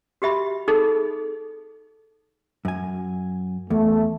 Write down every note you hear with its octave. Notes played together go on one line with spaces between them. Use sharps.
F#4 G4 E5 B5
D#4 G#4 A4
F#2 G#5
E2 A3